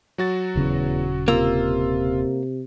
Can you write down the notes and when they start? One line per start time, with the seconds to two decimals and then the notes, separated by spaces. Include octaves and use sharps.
0.18 F#3 F#4 A6
0.56 D#1 E2 C#3 C#4
1.28 C3 A#3 F4 E6